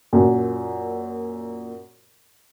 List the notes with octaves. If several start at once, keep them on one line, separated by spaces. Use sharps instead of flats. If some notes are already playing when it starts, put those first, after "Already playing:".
F#2 A#2